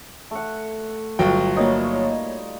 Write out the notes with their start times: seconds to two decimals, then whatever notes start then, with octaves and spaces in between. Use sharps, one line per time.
0.31 A3 F#5
1.19 G1 F#3 F4 F#4 G5
1.57 G3 A#3 D#4 C#5 D#5